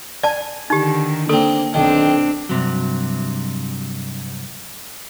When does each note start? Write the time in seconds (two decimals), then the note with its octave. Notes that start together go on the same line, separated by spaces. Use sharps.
0.23 D5 G#5 A5
0.70 D3 D#3 D#4 G4
1.29 A#3 C4 D4 A4
1.74 B1 D#3 C4 D4
2.49 G2 C3 F#3